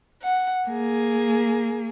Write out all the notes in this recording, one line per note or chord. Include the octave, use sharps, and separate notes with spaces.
F#5
A#3 G#4